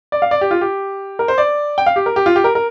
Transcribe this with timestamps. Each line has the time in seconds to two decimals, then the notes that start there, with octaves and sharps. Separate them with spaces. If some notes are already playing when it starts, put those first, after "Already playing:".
0.12 D5
0.22 F5
0.31 D5
0.41 G4
0.51 F4
0.61 G4
1.19 A#4
1.28 C5
1.38 D5
1.78 G5
1.86 F5
1.96 G4
2.06 A#4
2.16 G4
2.26 F4
2.36 G4
2.44 A#4
2.55 A#4